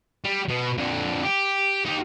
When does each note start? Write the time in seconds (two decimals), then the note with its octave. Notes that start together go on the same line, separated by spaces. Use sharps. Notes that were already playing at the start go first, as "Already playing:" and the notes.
0.24 G3
0.49 B2
0.78 F2 D3
1.23 G4
1.85 D#4 G4